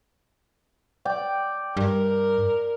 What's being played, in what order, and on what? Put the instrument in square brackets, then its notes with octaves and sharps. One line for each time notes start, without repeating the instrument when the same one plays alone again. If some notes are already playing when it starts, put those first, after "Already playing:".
[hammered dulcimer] D5 G5
[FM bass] G2 [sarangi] A#4